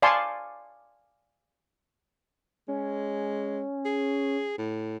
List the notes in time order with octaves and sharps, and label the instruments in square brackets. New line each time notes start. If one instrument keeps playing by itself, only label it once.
[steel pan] D5 F5 G#5 A5 C6 C#6
[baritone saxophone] G#3 [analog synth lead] C#4
[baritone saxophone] G#4
A2